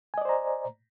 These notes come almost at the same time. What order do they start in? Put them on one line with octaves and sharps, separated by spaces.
G#5 D#5 D5 C5 A#5